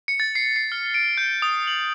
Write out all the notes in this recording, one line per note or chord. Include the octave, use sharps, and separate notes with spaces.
C#7
A6
C7
C7
F6
D7
G6
D#6
F#7